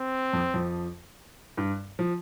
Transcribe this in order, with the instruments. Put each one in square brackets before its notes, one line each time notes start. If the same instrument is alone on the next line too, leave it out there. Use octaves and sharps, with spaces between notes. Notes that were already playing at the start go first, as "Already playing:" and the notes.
Already playing: [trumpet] C4
[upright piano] F2 F3
F2 F3
G2
F3